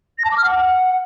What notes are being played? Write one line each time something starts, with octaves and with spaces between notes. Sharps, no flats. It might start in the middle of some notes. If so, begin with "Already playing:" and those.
A#6
A5
D6
F6
F#5